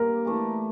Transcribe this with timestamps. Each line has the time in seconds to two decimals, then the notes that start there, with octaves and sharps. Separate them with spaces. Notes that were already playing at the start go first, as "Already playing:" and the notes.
Already playing: G2 A#3 A#4
0.25 E3 A3 D4